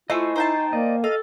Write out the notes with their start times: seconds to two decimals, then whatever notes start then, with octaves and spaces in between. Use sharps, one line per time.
0.10 A3 E4 F4 C5 D#5 G#5 C#6 E6
0.36 D#4 C5 G5 A5
0.73 A#3 D5 D#5
1.04 A4 D#5 F5